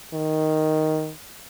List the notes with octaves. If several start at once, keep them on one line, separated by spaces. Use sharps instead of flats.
D#3